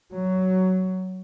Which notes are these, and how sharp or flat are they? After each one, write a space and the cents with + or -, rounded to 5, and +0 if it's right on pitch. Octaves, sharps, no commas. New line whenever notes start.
F#3 +10